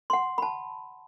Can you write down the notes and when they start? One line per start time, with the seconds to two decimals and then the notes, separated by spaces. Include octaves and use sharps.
0.10 F#5 C6
0.38 A5 B5